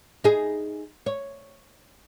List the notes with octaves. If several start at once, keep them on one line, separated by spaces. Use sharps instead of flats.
D#4 G#4
C#5